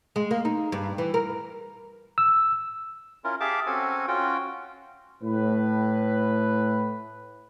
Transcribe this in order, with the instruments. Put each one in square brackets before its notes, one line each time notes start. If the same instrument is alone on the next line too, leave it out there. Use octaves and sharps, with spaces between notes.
[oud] G#3
A#3
D#4
G2
E3
A#4
[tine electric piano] E6
[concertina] C#4 E4 F4 A#4
G4 G#4 E5 F5 A5 D6
C4 C#4 F#4 A4 G#5
C#4 F4 F#4 G5
[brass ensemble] A2 B4